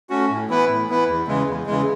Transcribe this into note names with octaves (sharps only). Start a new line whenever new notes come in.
A3 C#4 F#4
A2
E3 B3 E4 B4
A2
E3 B3 E4 B4
E2
C#3 E3 G#3
E2
C#3 E3 G#3